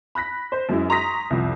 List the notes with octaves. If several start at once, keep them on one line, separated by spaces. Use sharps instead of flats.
B5 F#6 A#6 B6
C5
F#2 G#3 E4
A#5 C6 C#6 D#6 A#6 B6
C2 F2